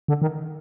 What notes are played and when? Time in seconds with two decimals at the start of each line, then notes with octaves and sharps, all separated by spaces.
0.08 D3
0.22 D#3